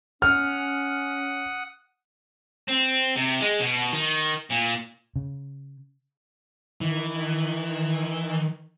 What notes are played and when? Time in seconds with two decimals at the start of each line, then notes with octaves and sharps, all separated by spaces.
0.22 C#4 F#5 D#6 F6
2.68 C4
3.16 C3
3.41 G#3
3.60 B2
3.93 D#3
4.51 A#2
5.16 C#3
6.81 D#3 E3